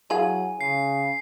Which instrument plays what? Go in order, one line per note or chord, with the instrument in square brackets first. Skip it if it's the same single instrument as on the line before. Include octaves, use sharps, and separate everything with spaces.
[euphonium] F#3 [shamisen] E4 G#4 F5 [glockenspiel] G#5
[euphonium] C#3 [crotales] C7